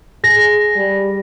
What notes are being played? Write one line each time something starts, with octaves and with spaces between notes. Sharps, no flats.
G#4 A#6
G3